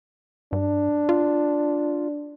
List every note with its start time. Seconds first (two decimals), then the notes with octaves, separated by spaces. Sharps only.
0.53 G2 D4
1.09 F4